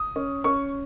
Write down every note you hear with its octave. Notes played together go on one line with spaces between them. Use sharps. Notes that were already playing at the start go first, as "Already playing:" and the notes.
Already playing: D#6
C#4
C#4 C#6